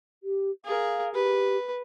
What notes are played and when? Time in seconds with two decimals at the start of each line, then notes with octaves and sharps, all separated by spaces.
0.23 G4
0.65 G#4 A#4 F5
1.14 G4 B4